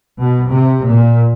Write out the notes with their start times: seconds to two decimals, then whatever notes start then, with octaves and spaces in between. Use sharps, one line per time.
0.20 B2
0.50 C3
0.86 A#2